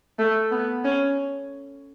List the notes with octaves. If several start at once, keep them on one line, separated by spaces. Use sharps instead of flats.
A3
B3
C#4